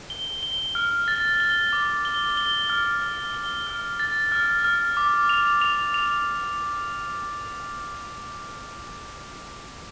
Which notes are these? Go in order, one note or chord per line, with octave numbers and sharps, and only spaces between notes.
G7
G7
F6
A6
G7
D6
G7
G7
F6
F6
G7
F6
A6
F6
F6
D6
F7
F7
F7